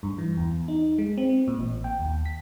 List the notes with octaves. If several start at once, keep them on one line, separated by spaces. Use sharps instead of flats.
G2
E3
E2
D#4
G#3
C4
A#2
A1
G5
D#2
B6